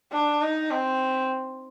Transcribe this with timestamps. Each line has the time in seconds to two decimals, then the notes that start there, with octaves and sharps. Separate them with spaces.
0.12 D4
0.41 D#4
0.70 C4